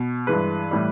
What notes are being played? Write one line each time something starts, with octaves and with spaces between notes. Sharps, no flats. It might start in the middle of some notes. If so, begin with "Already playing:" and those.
Already playing: B2
G2 E3 G#3 B4
A2 E3 G3